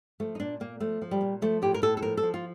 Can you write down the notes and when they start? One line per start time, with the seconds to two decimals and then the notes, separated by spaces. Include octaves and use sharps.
0.20 F3 A3
0.35 D#4
0.40 A#2 D4
0.60 A#2 A#3
0.80 F3 A3
1.02 F3
1.11 G3
1.21 A#2
1.42 F3 A3
1.62 A2 G4
1.74 A#4
1.82 A2 A4
1.97 A4
2.02 F3 A#4
2.17 A4
2.23 F3
2.34 F4